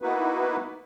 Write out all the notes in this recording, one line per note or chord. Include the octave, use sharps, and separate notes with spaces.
A#3 B3 D#4 E4 F#4 B4